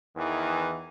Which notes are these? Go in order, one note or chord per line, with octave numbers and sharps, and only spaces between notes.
E2 D#3 E3